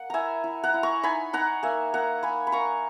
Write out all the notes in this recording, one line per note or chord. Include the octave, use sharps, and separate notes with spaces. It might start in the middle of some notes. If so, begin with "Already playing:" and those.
Already playing: A#3 F#5
E4 E5 G#5 A#5
E4
F#5 A#5
E4
A#5 C#6
D#4 G#5 B5
D#4 F#5 A#5
A#3 E5 G#5
A#3 F#5 A#5
A#3 G#5 B5
B5
A#3 A#5 C#6